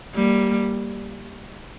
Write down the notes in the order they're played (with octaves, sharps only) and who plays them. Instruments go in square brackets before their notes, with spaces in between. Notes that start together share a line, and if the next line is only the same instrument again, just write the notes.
[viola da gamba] G3 A#3